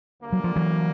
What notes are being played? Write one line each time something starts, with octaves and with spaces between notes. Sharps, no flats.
D2 D3 G3 A#3
F#3
F3
E3 F#3